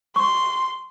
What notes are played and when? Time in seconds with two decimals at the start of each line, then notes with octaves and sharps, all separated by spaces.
0.16 C6 C#6